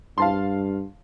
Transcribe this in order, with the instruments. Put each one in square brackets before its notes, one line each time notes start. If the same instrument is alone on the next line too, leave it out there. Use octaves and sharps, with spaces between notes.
[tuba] G2 [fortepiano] F5 A5 C6